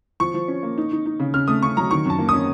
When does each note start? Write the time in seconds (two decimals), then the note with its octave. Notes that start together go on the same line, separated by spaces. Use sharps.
0.20 F3 C#6
0.34 F3
0.48 C#4
0.63 A#3
0.78 D#4
0.92 D#4
1.06 D#4
1.20 C#3
1.34 C#3 F6
1.48 A3 D#6
1.62 C#3 C#6
1.76 F#3 A#5
1.91 D#3 C#6
2.06 F#2 A5
2.19 A#3
2.29 C#4 D#6